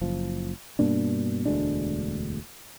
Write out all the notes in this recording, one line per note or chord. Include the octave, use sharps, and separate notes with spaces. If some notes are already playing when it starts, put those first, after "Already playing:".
F#1 F3
G2 B2 A#3 D4
E1 D2 G#3 D4